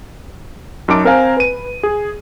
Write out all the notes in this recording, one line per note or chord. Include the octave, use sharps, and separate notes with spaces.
F#2 D#4 A5 D6 D7
C4 A#4 C5 F5 G#5 A#5
B4 D#7
G#4